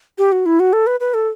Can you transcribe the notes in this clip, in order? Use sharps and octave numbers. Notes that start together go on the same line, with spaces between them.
G4
F#4
E4
F#4
A4
B4
B4
A4